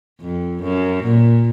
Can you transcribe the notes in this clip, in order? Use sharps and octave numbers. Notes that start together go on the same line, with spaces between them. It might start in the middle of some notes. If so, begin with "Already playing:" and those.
F2
F#2
A#2